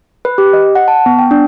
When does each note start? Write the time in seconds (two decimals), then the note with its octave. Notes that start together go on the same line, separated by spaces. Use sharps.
0.25 B4
0.38 G4
0.53 D#5
0.75 F#5
0.88 A5
1.06 B3
1.19 G5
1.31 D4